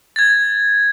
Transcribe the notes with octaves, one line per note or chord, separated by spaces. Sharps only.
G#6 A6